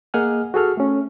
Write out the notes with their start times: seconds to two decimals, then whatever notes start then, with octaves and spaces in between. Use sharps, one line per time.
0.14 A#3 G#4 D#5 F#5 G#5 F6
0.54 F#4 G#4 A4 F6
0.77 A3 C#4